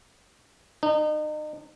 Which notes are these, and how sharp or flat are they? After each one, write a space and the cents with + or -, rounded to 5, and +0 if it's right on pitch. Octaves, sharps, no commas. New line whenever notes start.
D#4 -35